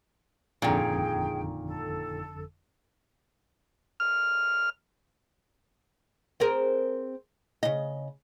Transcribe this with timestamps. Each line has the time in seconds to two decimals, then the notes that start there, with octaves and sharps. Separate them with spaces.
0.62 G1 F2 A#2 D3 D#3 G#4 G5
1.67 A4
4.00 F6
6.40 C4 G#4 A#4
7.63 C#3 D#5